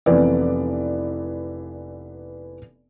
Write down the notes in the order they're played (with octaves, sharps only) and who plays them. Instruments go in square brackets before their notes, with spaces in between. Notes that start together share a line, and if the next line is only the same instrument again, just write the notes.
[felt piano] F1 E3 B3 D5